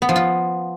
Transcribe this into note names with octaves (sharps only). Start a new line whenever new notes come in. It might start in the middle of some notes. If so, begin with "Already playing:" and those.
B3
F3
F4